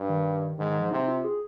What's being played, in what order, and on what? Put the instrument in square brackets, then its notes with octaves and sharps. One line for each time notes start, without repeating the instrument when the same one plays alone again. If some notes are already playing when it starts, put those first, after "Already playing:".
Already playing: [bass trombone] G2
[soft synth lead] D#3
[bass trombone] G#2 [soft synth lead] D#3
[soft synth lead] D#3
F3
[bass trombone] C3 [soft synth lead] D#4
[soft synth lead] F4
G#4